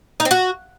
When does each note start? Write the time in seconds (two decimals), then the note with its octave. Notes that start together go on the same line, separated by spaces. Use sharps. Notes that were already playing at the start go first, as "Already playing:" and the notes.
0.20 D#4
0.25 C4
0.31 F#4